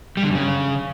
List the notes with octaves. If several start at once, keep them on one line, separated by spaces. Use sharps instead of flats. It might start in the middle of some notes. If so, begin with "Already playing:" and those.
G3
D3
F#2
C#3